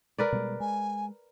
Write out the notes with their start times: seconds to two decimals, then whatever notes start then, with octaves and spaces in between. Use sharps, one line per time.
0.18 A#4 B4 D5
0.32 B2 G3 G#3
0.60 G#3 G#5